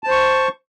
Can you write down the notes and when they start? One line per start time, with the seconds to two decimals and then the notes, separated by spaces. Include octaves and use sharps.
0.04 A5
0.07 C5
0.11 C#6